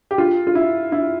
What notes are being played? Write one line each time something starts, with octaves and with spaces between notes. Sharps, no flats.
G4
F4
F4
E4
E4